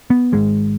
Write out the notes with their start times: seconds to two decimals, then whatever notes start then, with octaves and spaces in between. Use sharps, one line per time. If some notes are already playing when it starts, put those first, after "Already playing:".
0.10 B3
0.32 G#1 G#2 G#3